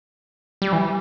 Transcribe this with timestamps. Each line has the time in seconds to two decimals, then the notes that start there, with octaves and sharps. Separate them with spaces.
0.62 G3
0.73 E3